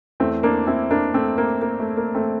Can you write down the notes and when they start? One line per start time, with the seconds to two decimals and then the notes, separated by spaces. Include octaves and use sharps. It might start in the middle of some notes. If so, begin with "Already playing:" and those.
0.20 E2 E3 A3 C4
0.43 A#3 D4
0.67 C4 E4
0.91 A#3 D4
1.14 A3 C4
1.38 A#3
1.62 A#3
1.79 A3
1.97 A#3
2.15 A3 C4